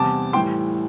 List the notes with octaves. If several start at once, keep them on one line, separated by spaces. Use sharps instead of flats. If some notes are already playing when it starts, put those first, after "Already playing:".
Already playing: E2 C3 G3 A5 D6
A2 E3 G3 G5 C6